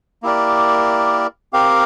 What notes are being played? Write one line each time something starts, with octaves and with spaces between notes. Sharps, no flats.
A#3 E4 G4 A#4 D5
C4 G4 A#4 F5